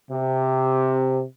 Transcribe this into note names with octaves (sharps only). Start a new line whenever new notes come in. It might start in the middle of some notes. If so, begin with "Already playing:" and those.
C3